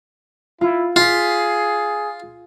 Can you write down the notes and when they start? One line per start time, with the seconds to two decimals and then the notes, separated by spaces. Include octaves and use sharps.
0.61 E4 F4
0.96 F4 G#4 F5 B6